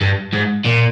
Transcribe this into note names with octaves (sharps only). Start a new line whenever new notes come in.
G2
G#2
A#2